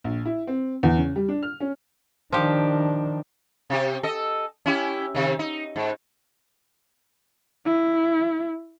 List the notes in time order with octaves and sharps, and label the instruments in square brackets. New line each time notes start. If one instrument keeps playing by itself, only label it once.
[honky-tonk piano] A#1
E4
C4
E2
C#3
G3
D4
F6
C#4
[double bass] D#3 D4 [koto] F3 G4
[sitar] C3 G4
A4 D#5
C#4 E4 G4
C3 D#3
D#4
G#2
[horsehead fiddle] E4